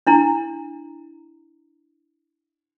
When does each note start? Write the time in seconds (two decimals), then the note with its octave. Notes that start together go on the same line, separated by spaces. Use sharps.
0.07 D4 E4 A#5